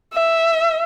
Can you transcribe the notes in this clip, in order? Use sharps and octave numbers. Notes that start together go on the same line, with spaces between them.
E5